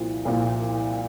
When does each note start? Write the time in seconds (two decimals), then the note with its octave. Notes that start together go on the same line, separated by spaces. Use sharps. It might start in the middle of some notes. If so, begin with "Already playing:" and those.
Already playing: C2 A#2 F3
0.25 C2 A#2 F3